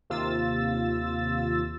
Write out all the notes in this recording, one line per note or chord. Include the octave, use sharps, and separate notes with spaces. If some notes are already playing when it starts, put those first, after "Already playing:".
D#2 C3 F4 E6 A6